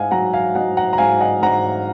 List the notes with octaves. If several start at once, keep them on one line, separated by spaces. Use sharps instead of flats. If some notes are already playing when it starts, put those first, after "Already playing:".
Already playing: G#2 D#5 F5 F#5 G#5
F#3 F#5 A#5
F5 G#5
F#3 D#5 F#5
F#5 A#5
A#5
G#2 F5 G#5
D#5 F#5
G#2 F#5 A#5